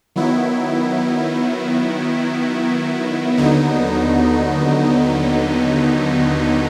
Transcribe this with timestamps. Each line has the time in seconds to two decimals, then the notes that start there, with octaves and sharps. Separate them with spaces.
0.16 D#3 F#3 B3 E4
3.38 D#2 D3 F#3 B3 D#4